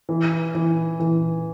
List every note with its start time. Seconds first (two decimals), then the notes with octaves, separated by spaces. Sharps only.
0.09 E3
0.55 E3
1.00 E3